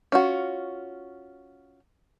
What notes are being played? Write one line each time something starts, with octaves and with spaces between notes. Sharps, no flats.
C#4 F4 F#4